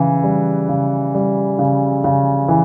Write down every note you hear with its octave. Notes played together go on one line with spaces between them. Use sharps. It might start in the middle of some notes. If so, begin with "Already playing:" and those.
Already playing: C#3 E3
G3
C#3
G3
C#3
C#3
E3